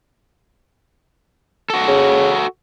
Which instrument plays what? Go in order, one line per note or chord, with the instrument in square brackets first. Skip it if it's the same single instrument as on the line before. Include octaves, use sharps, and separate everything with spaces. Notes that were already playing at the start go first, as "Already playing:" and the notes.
[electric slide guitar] F#4 A4
[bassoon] C#3